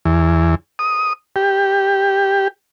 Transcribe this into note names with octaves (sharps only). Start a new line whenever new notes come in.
E2
D#6
G4